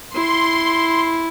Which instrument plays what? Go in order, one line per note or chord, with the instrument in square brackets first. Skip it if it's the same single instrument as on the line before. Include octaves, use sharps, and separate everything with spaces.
[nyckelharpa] E4 [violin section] C6